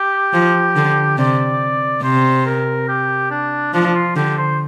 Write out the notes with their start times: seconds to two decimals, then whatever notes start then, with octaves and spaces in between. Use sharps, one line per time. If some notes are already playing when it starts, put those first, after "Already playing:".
Already playing: G4
0.33 F3
0.76 D3
1.18 C3 D5
2.03 C3 C5
2.46 A#4
2.88 G4
3.30 D4
3.73 F3 D4
3.95 F4
4.16 D3 G4
4.37 C5